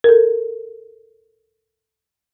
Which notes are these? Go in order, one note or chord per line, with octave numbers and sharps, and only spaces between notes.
A4 A#4